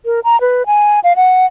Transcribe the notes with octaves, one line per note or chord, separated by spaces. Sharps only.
A#4
A#5
B4
G#5
F5
F#5